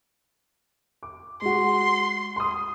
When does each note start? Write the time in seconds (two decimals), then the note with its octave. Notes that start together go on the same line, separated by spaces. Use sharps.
1.03 D6
1.41 G#3 F#4 C6
2.36 C6 D#6